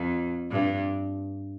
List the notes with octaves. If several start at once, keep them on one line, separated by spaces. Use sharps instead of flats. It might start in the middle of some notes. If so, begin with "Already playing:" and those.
Already playing: F2
G2